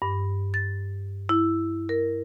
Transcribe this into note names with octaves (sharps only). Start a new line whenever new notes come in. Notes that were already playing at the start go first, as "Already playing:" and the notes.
G2
A6
E4
A#4